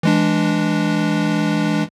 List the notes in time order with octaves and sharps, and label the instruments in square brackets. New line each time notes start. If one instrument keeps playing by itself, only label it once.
[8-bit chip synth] E3 G#3 D4